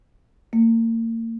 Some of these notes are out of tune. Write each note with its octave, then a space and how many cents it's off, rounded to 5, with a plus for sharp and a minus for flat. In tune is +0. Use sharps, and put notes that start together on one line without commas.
A#3 -40